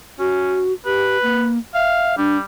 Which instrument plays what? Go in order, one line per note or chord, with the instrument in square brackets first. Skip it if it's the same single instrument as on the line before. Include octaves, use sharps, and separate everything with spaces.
[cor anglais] C#4 [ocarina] F#4
[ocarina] G4 [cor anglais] B4
[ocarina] A#3
[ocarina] E5 [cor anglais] F5
[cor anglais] G3 [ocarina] D4